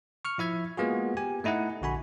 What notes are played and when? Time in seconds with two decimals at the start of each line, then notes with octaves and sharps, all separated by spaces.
0.25 C#6 F6 C#7
0.38 F3 E4 E5 G#6
0.77 G#3 A#3 B3 F4 F#4 G#4
1.17 G4 G#5
1.44 A3 D#4 E4 D#5 F#5
1.82 A#1 D3 F#4 G#5 B5